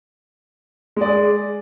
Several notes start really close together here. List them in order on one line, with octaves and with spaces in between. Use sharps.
G#3 D5 G#4